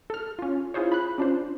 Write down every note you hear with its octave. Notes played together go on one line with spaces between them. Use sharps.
A4 F6
C#4 F4
E4 F4 G#4 C5 C#5
B5 F#6
C#4 D4 F4 C5